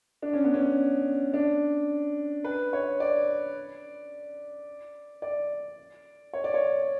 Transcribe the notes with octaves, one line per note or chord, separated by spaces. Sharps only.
D4
C#4
B3
C#4
D4
B4
C#5
D5
D5
C#5
D5
C#5